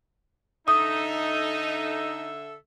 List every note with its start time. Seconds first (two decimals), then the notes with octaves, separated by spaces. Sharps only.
0.68 D3 D#4 A4 E5 D#6